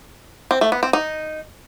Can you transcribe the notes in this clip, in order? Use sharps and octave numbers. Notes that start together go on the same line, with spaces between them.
C4
A3
B3
C4
D#4